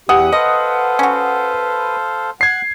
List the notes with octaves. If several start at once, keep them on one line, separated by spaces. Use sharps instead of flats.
E2 E3 G4 F#5 D#6
A4 B4 C5 D#5 F5
C#4 F#4
F#5 G#6 C7